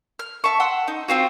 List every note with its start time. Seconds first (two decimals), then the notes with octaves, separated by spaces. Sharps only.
0.19 F6
0.44 E5 A5 C#6
0.60 F#5 C6 E6
0.88 D#4
1.08 C4 F4 F#4